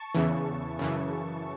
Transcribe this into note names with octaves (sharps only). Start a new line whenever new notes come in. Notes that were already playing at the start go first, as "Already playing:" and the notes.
Already playing: A5 C#6
E2 C#3 E3
F#2 C#3 E3